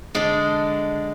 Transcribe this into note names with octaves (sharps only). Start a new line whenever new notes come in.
D3 G#3 D4 A4